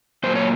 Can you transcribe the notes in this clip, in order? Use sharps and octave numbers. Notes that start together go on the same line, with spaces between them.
A#2 F#3 A#3 C5
C#5